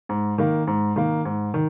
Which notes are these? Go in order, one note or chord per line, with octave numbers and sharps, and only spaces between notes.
G#2
D#3 A#3
G#2
D#3 A#3
G#2
D#3